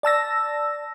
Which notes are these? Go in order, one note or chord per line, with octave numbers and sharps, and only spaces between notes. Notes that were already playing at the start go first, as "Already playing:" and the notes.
D5 A5 E6 A#6